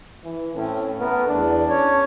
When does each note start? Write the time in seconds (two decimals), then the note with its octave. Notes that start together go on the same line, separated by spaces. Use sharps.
0.24 E3
0.55 A2 C4 C#4
0.99 A3 B3 A#4
1.28 E2 E3 D4
1.69 C#4 C#5